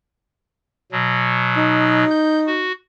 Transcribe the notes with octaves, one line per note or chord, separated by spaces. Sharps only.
B2 F#3
D#4
G6
F#4